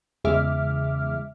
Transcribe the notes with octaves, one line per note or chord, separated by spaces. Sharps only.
E2 C#3 G#3 E5 D6 F6